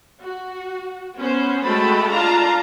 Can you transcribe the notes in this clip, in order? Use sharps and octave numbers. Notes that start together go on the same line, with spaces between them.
F#4
B3 C#4 C5
G#3 A3 F#4 G5 A5 B5
D4 F4 F5 A5 A#5